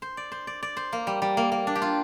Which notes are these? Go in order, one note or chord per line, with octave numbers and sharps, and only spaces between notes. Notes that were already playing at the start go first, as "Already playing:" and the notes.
C5
D5
C5
D5
D5
C5
A#3
G3
G3
A#3
A#3
D4
G4
F4